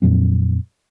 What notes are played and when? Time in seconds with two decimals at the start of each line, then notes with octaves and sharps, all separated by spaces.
0.02 F2 A#2 F#3 C4